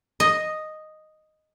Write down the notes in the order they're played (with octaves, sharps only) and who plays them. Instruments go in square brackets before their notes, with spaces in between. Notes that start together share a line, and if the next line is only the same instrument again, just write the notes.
[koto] D#5